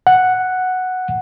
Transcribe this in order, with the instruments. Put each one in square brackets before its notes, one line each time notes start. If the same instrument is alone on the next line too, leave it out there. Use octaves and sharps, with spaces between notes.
[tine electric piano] F#5